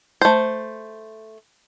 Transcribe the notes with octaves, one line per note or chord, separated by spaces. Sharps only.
A3 C5